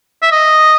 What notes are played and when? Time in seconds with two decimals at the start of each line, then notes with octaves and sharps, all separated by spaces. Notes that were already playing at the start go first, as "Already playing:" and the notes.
0.23 E5
0.32 D#5